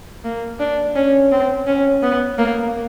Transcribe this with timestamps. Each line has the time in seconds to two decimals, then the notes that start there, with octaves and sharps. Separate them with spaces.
0.24 A#3
0.60 D4
0.96 C#4
1.32 C4
1.67 C#4
2.03 B3
2.38 A#3